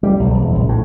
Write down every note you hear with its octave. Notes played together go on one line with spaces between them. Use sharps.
G3
B1
E1
A#1
A2